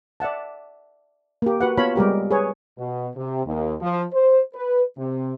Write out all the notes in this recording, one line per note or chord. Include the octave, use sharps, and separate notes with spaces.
D5 E5 F#5 A5
A#3 G4
F#4 B4 F#5
B3 F4 C#5 F5 A5 B5
G3 G#3 G4 A#4
G#4 B4 C#5
B2
C3
D#2
F3
C5
B4
C3